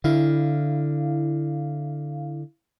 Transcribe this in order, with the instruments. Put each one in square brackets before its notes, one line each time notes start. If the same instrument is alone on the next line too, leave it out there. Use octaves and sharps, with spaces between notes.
[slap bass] D3 [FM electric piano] E4 F5